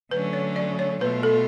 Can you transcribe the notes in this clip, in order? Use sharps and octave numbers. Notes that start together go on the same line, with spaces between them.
D3 F#3 A3 C#4 B4
C#5
D5
C#5
B2 A3 F4 B4
A4